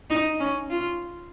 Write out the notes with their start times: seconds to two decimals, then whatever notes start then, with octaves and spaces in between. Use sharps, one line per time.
0.10 D#4
0.40 C#4
0.70 F4